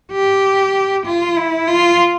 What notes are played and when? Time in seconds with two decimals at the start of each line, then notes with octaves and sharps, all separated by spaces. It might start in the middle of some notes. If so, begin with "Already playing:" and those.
0.12 G4
1.05 F4
1.36 E4
1.67 F4